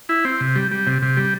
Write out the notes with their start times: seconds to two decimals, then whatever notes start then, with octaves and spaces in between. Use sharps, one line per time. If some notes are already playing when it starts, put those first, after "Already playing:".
0.09 E4
0.25 C4
0.41 C3
0.56 G3
0.71 G3
0.87 C3
1.02 C3
1.17 G3